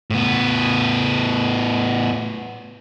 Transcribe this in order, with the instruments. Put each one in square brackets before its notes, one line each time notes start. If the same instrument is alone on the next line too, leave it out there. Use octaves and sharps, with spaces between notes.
[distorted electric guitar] A2 B3